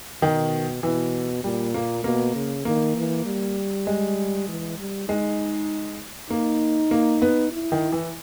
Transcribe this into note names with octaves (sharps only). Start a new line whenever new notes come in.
B2 D#3
B2 E3
A#2 G3
A#3
B2 A#3
C#3
D#3 A#3
E3
G3
G#3
E3
G3
G#3 D#4
A#3 D#4
A#3
B3
E4
D#3
E3